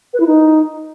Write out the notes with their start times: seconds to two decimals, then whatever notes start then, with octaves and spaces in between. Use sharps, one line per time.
0.13 B4
0.20 E4
0.26 D#4